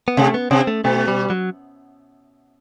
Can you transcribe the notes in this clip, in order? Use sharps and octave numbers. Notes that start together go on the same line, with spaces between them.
B3
C3 A3
B3
C3 C4
A3
B2 A3
G3
F#3